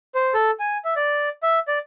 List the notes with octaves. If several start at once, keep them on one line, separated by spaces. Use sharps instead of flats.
C5
A4
G#5
E5
D5
E5
D5